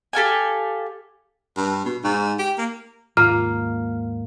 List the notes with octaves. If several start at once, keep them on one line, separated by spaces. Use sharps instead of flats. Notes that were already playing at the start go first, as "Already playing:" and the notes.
G4 A4 F5 G#5
G2
B2
G#2
G4
A#3
D#2 G#2 A#3 F4 F6